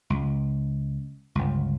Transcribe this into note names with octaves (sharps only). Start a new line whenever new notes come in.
C#2
G1 C#2